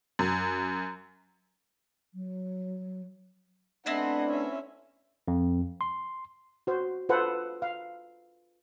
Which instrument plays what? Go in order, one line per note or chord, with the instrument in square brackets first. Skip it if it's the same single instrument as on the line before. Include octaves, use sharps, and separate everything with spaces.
[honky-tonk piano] F#2
[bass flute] F#3
[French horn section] A3 B3 D4 [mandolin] C4 E4 G#5 [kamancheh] D#5 F#5
[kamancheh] C#4 E5
[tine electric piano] F2
C6
[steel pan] F#4 C5
F4 A4 B4 C5 F#5
F5